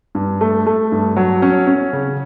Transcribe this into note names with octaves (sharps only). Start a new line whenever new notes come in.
G2
A3
A3
G2
F#3
C#4
C#4
C#3